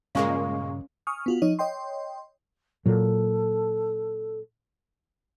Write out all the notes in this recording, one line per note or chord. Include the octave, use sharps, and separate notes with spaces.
G2 A#2 C#3 G#3 A#3 C#4 F5 C#6
G#5 C#6 D#6 F6
B3 F4 F#4
F3 D#4 C#5 D#5
C#5 D#5 G5 C6
A#2 F#3 A4